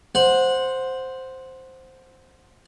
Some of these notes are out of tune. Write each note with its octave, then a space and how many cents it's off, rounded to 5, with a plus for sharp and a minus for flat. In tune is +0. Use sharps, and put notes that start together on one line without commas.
C5 +0 F#5 -15